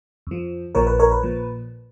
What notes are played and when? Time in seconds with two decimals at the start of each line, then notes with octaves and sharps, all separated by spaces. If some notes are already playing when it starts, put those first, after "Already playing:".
0.27 F2 F3
0.75 A#1 A#2 F3 A#4 C#5
0.87 B4
0.99 A#4 C#5
1.11 B4
1.23 A#2 F3